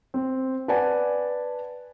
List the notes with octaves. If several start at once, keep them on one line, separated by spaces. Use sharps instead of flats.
C4
B4 D5 F#5 G#5 A5